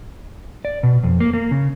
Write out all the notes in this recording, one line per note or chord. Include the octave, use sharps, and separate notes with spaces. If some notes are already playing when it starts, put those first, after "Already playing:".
D5
B2
F2
A#3
A#3
C#3